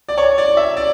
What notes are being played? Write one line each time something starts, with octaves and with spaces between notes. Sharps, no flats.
D5
C#5
D5
E5
D5